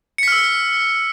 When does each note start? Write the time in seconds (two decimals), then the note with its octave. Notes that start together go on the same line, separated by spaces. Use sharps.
0.18 C#7
0.23 B6
0.28 F6
0.32 E6